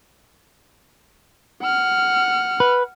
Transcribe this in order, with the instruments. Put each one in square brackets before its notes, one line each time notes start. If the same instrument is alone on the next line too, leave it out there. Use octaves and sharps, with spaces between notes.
[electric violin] F#5 F6
[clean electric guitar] B4